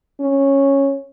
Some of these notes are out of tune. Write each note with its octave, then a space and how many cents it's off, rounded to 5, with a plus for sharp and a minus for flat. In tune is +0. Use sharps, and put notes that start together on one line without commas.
C#4 -10